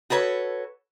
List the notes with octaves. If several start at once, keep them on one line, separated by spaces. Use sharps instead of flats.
F#4 A4 B4 C#5